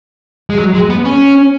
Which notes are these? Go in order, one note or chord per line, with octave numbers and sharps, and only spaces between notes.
G#3
F#3
G#3
B3
C#4